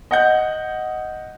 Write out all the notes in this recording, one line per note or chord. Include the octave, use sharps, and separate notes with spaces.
D#5 F#5 G6